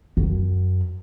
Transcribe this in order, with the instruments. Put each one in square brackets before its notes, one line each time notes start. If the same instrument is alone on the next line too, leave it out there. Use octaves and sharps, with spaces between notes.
[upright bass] F#2